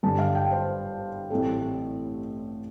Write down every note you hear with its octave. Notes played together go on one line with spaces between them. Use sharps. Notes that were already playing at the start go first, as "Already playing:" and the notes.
G1 G2 D3 A5
F5
G5
C5
A1 A2 G3 C4 A4